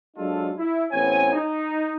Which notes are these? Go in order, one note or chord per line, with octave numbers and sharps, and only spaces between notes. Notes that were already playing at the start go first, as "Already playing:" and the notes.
F#3 G#3 D4 D#4 F4 A4
E4
A1 B3 C4 C#5 G#5
D#4